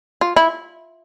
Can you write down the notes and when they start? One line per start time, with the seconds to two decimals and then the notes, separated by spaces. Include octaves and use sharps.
0.21 F4
0.36 E4